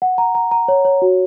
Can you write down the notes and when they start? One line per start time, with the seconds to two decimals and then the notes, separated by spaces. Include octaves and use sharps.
0.02 F#5
0.18 A#5
0.35 A#5
0.51 A#5
0.68 C#5
0.85 C#5
1.02 F#4